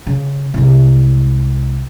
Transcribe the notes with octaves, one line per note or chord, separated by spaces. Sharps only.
C#3
C2 G#3